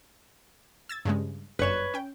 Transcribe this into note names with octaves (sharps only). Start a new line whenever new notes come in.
E6 G#6 A6
G2 C#3 G#3
G1 F#2 B4 C#5 E7
C#4 G5